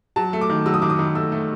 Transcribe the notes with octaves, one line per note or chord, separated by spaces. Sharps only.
F#3 A5
A3
D6
D#3
F#3 E6
D#6
D#3 D6
D#6
D#3
A3 E6
A3